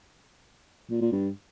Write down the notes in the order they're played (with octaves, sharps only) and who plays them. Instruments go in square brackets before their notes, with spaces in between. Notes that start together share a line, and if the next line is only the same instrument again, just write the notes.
[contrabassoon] A#2
A#2
G2